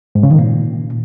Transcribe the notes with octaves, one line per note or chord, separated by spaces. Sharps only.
G#2
C#3
D#3
A#2